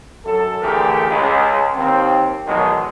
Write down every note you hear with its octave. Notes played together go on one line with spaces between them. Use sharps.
F#2 A4
D3 E3 A3 G4 G#4 A#4
C#2
D#2 C4
B1 E2 B2 D#3 F#3 G#3